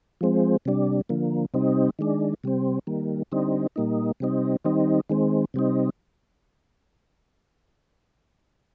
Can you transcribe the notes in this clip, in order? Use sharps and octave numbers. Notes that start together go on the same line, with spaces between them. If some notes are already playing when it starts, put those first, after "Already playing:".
F3 G#3 C4
C3 G3 D4
D3 F3 A#3
C3 G3 C4 D#4
D#3 G#3 D4
C3 G3 C4
D#3 G3 A#3
D3 G3 C4 D#4
A#2 G3 A#3 D#4
C3 G3 C4 D#4
D#3 G3 C4 D#4
D#3 G#3 C4
C3 G3 C4 D#4